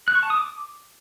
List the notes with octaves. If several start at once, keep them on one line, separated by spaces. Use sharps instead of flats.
F#6
C#6
A5
D#6
D6